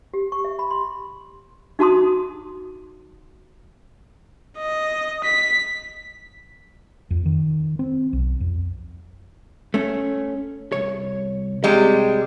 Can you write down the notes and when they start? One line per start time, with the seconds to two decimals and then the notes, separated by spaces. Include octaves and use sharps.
0.14 G4
0.32 C#6
0.44 E5
0.59 B5
0.70 C6
1.79 D#4 F#4 A5 C6 D#6
4.58 D#5
5.24 B6
7.11 F2
7.25 D#3
7.79 C4
8.13 B1
8.40 F2
9.74 A3 C#4
10.72 C2 B2 C#5
11.64 C3 G3 G#3 D#5